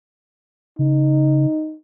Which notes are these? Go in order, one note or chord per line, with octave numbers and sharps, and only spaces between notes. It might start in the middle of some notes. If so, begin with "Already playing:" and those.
C#3 D#4